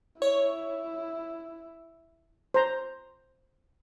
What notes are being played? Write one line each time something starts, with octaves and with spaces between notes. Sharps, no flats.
E4 C#5
C5 A#5